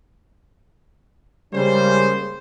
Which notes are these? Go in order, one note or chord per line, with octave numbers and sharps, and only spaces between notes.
C#3 G3 G#3 A#3 C#4 C5